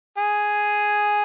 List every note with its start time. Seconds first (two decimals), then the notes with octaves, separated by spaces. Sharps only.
0.17 G#4